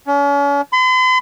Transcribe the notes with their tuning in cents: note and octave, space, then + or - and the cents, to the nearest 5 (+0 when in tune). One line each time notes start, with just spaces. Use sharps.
C#4 +40
C6 -45